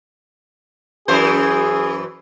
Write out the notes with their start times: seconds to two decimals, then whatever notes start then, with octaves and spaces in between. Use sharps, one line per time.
1.08 F#2 E3 G#4 C5